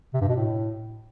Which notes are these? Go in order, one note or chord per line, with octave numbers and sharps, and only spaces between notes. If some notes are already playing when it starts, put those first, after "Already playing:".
C3
G2
B2
A2